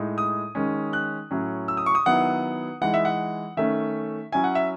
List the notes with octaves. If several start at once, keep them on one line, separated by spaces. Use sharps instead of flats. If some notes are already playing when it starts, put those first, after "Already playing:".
Already playing: A2 G#3 D#4
D#6
D#3 G#3 C#4
F#6
A2 F#3 C#4
E6
D#6
C#6
D#6
D#3 F#3 B3 E4 F#5
E3 G#3 D#4 F#5
E5
F#5
D#3 A3 C#4 E5
F#3 C#4 E4 G#5
F#5
E5